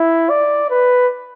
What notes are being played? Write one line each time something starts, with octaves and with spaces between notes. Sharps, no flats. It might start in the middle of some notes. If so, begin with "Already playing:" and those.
Already playing: E4
D5
B4